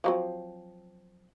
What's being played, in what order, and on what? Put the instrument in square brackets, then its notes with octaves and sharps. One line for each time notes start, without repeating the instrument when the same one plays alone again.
[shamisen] F3 F#3 C4